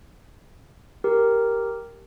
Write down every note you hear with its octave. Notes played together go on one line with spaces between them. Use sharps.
G4 A#4